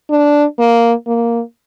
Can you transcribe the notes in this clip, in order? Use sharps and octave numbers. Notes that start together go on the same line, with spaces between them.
D4
A#3
A#3